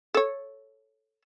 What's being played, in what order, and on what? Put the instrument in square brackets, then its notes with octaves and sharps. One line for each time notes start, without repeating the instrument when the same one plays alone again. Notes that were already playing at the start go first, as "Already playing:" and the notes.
[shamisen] A4 C#5